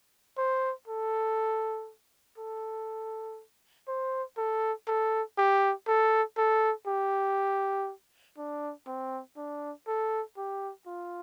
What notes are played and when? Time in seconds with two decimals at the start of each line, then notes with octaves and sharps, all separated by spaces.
0.38 C5
0.88 A4
2.38 A4
3.88 C5
4.38 A4
4.88 A4
5.38 G4
5.88 A4
6.38 A4
6.88 G4
8.38 D4
8.87 C4
9.37 D4
9.87 A4
10.37 G4
10.87 F4